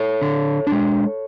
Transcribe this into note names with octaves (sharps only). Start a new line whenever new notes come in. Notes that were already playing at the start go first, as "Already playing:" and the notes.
Already playing: A4 C#5
D3
D4
G#3